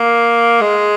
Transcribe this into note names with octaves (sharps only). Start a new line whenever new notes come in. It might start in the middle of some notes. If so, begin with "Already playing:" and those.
Already playing: A#3
G#3